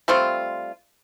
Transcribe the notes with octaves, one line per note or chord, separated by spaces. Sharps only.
G3 A3 C4 F4